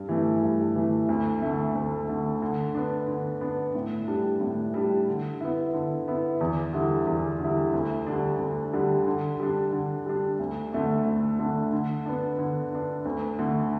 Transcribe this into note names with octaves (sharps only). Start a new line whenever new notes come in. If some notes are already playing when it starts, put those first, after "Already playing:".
Already playing: G2
E3 A3
G2
E3 A3
D2
D3 A3
D2
D3 A3
D3
B3 D4
D3
B3 D4
A2
G3 D4
A2
G3 D4
D3
B3 E4
D3
B3 E4
E2
D3 G3 E4
E2
D3 G3 E4
D2
D3 G3 D4
D2
D3 G3 D4
D3
G3 D4
D3
G3 D4
D2
D3 A3 D4
D2
D3 A3 D4
D3
B3 D4
D3
B3 D4
D2
D3 A3